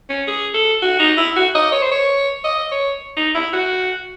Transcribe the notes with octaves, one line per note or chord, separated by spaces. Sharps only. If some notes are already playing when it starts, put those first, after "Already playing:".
C#4
G#4
A4
F#4
D#4
E4
F#4
D#5
C#5
C5
C#5
D#5
C#5
D#4
E4
F#4